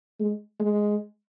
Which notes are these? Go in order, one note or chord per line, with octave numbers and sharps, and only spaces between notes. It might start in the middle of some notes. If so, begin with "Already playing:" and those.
G#3
G#3